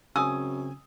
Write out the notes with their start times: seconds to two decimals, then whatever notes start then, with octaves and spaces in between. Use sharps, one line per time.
0.16 F#2 C#3 C4 G#5 D#6 E6